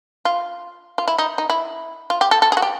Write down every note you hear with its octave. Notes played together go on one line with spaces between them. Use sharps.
F4
F4
E4
D#4
D#4
E4
F4
G4
A4
A4
G#4
F#4
G4